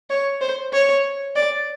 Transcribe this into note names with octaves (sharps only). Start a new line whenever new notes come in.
C#5
C5
C#5
D5